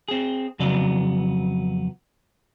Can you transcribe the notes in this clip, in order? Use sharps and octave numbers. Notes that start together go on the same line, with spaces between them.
C4 G#4
F2 C#3 F#3 B3 D5